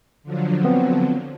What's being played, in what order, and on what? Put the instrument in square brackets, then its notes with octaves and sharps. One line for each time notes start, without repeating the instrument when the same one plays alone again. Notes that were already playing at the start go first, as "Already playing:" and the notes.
[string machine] D3 F3 F#3
[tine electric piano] B3 C4